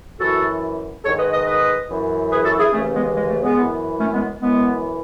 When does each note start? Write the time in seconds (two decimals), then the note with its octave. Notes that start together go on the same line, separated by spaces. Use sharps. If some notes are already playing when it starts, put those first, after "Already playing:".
0.19 F#2 E3 F#4 A4
1.04 G#2 D#3 A4 C#5
1.18 B4 D#5
1.32 B4 D#5
1.46 B4 D#5
1.89 F#2 E3
2.31 G#4 B4
2.45 F#4 A4
2.59 E4 G#4
2.73 D#2 C#3 E3 A3 C#4
2.94 G#3 B3
3.15 G#3
3.29 A3
3.43 G#3 B3
3.58 F#2 E3
3.99 A3 C#4
4.13 G#3 B3
4.41 F#2 E3 G#3 B3